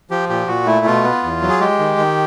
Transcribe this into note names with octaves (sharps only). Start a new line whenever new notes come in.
F3 G4
A#2 G4
A#2 F#4
A3 E4
B2 F4
B3
E2
F#3
G#4
G#3 G4
D#3
D#3